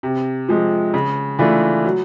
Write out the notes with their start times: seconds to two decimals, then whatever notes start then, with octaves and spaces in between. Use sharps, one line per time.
0.03 C3
0.49 F3 G#3
0.94 C#3
1.39 E3 A3 D4 F4
1.85 F#3